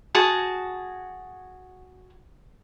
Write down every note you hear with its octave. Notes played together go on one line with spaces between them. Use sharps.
F#4 G#4 A5